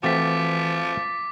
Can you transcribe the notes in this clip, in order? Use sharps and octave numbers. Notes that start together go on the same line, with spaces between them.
E3 F3 A3 C4 F#4 D6 A6 B6